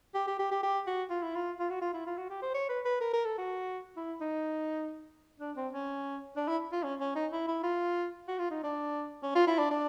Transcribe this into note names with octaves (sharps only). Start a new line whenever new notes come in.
G4
G4
G4
G4
G4
F#4
F4
E4
F4
F4
F#4
F4
E4
F4
F#4
G4
C5
C#5
B4
B4
A#4
A#4
A4
F#4
E4
D#4
D4
C4
C#4
D4
E4
F4
C#4
C#4
D#4
E4
E4
F4
F#4
F4
D#4
D4
C#4
F4
E4
D4
D4